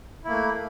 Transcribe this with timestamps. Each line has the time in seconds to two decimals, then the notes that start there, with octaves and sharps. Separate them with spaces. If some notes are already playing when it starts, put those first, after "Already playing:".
0.24 E4
0.27 A#3
0.30 A3